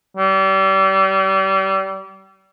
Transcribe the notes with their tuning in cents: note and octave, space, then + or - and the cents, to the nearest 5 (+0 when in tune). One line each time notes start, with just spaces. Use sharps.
G3 -30